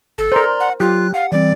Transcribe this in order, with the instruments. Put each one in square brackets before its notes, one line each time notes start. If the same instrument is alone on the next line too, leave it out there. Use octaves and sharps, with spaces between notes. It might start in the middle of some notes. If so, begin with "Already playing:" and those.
[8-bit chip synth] G1 [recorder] A4
[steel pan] A#4 C5 [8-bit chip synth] D5 A#5 C6
[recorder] F#5
[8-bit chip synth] F#3 F#6 [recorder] F4 [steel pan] G4
[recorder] F5 [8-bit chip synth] F#5
[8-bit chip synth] E3 G3 C4 [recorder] D5